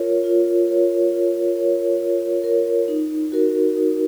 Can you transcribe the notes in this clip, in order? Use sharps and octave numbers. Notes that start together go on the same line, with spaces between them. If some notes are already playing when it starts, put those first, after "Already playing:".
Already playing: F4 A#4 C#5
F4
A#4 C#5
F4
A#4 C#5
F4
A#4 C#5
D#4
F#4 A#4
D#4